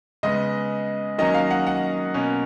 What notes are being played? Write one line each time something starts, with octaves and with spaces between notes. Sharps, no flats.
C#3 G#3 B3 D#5
D#3 F#3 A#3 C#4 D#5
F5
F#5
F#5
B2 A#3 C#4